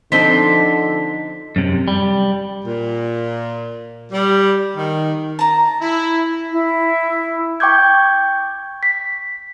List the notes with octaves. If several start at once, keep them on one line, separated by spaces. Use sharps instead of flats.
D3 F3 C4 D#4 A4 C5 B6
F#2 C3
G3
A#2
G3
D#3
A5 A#5
E4
E4
G5 C#6 D6 G6 G#6
B6